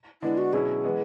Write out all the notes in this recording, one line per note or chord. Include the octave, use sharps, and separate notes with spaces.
D3 G#3 B3 D4 E4
F#4
B2 F#3 C#4 E4 G#4
E3 G#3 B3